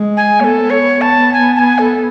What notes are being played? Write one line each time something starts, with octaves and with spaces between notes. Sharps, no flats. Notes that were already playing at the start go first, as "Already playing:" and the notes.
Already playing: G#3
G#5
B3 A4 C#5
C#5
A5
G#5
A5
G#5
A4